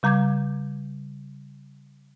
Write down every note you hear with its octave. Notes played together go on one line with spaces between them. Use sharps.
C#3 G3 A#5 D6 G6 G#6